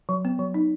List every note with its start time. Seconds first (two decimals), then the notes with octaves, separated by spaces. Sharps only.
0.09 F#3
0.25 B3
0.39 F#3
0.54 D#4